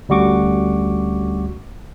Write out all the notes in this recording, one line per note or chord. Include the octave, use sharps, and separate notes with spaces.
D2 G3 C#4 F#4 C#6 D6